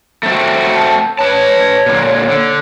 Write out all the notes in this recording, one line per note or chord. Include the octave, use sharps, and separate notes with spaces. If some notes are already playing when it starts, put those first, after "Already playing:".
A3 C4 F#4
A5
B4 C#5 A5
A#2 D3
D3